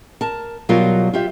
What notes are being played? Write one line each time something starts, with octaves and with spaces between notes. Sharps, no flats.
A#4 A5
B2 F#3 G3 F4 F#4 A#4
F4 G4 E5